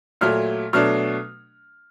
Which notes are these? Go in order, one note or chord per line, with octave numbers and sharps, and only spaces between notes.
A#2 F#3 A3 F6
B2 F#3 A3 D4 F6